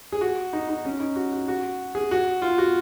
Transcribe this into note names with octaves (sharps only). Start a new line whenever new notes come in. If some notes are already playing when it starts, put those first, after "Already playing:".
G#4
F#4
D#4
D#4
C#4
D#4
F#4
F#4
F#4
G#4
F#4
F4
F#4